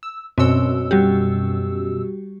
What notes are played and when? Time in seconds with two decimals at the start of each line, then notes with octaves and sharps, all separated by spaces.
0.03 E6
0.38 F#2 B2 C4 C#5 E6
0.91 G3 F#4 G4